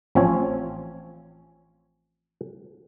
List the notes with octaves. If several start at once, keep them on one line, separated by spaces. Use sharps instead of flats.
A1 F3 C4 C#4 G#5